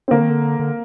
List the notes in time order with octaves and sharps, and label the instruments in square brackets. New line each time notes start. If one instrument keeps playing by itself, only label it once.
[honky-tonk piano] C4
[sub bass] D3 [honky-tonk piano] A#3
[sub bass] D#3
D3
D3